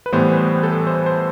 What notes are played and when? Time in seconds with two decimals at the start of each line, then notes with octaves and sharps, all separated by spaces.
0.06 B4
0.12 A2 E3 G3 B3 C5
0.37 C5
0.63 A4
0.87 C5
1.06 C5